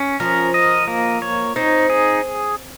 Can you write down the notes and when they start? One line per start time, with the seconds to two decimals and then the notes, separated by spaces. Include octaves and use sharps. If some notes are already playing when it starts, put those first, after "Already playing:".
Already playing: C#4
0.20 F3 A#4
0.54 D#5
0.88 A#3
1.22 C#5
1.56 C4 D#4
1.90 G#4